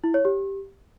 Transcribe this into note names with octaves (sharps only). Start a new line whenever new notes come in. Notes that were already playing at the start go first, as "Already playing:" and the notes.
E4
C#5
G4